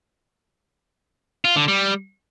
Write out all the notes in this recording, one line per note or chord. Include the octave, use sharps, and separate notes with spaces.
F4
D3
G3